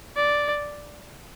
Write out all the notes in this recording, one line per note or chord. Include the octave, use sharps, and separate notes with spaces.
D5